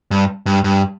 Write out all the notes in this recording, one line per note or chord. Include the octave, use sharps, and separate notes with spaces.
G2
G2
G2